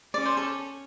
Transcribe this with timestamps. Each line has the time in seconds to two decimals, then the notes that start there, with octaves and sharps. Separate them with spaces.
0.14 C#4 D5
0.25 C5
0.37 A4